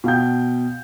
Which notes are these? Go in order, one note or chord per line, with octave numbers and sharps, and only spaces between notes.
B2 F5 G5 G6